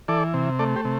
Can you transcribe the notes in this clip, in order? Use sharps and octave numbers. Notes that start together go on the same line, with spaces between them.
E3 A4 D5
C3
A3 A4 D5
G4 C5
C3